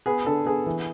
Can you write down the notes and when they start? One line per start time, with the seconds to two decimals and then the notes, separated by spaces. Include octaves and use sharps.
0.06 B3 G#4
0.26 D3 A4
0.46 B3 G#4
0.66 E3